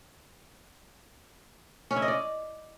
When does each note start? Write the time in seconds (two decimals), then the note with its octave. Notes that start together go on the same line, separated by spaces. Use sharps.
1.91 C#4
1.96 E4
2.02 D#5
2.08 D5